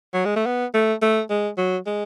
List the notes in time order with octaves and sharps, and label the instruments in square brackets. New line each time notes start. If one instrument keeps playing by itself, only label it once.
[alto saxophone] F#3
G#3
A3
B3
A3
A3
G#3
F#3
G#3